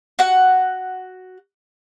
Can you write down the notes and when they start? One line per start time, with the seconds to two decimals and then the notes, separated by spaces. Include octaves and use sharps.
0.19 F#4 F#5